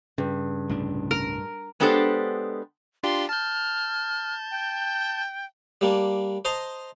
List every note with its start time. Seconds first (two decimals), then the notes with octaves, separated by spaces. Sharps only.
0.18 G2 C#3
0.69 C2 A2 D4
1.11 A#4
1.80 G#3 B3 D4 G4 A4 C5
3.03 D4 F4 G4 C6
3.29 A5 F6 G6
4.51 G5
5.81 G3 A#3 D4
6.45 C5 D#5 A5 A#5 C6